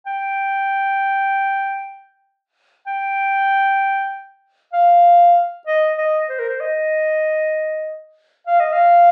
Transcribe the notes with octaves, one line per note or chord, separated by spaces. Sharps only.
G5
G5
F5
D#5
D#5
C5
A#4
C5
D#5
F5
D#5
F5